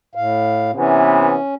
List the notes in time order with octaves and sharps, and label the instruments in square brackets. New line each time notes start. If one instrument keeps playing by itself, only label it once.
[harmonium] A2 F5
[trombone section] C3 E3 B3 [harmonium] C#4